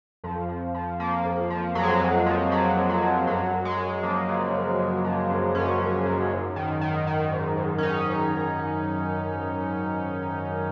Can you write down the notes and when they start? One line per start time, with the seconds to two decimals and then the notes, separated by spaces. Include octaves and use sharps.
0.24 F2 F3
0.49 F3
0.74 F3
1.00 F3 A#3
1.25 F2
1.50 F3
1.75 F2 F#3
1.83 G#3
1.91 F#3
2.01 F2
2.26 F3
2.51 F3 F#3
2.77 F2
2.89 F#3
3.02 F3
3.27 F#2 F#3
3.53 F#2
3.65 G#3
3.78 F#2
4.03 F3 A#3
4.28 C#3
4.54 F#2
4.79 F#2
5.04 F3
5.30 F#2
5.55 F#2 C#4
5.81 F#2
6.06 F#2
6.31 G#2
6.56 D#3
6.81 D#3
7.07 D#3
7.32 G#2
7.57 G#2
7.78 C#4
7.83 G#2 D#4
8.08 G#2
8.33 D#3